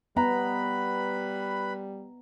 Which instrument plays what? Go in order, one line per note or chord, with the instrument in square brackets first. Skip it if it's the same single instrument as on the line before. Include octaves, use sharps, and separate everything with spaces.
[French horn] G3 [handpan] B3 [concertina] B4 B5 [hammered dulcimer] A#5